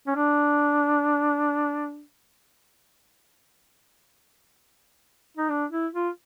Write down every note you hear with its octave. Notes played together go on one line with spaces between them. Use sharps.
C#4
D4
D#4
D4
E4
F4